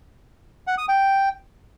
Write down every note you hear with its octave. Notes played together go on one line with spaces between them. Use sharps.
F#5
D#6
G5